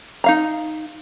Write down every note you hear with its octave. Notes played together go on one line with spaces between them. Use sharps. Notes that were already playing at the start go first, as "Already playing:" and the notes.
D#4 F5 A#5